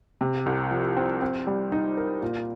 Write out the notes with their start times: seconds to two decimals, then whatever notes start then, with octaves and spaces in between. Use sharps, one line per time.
0.21 C3
0.46 C2
0.71 F3
0.97 C4
1.22 C4
1.47 G3
1.72 D#4
1.97 A#4
2.22 A#2